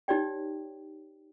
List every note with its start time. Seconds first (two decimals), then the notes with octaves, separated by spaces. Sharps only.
0.08 D#4 G4 C#5 D5 G5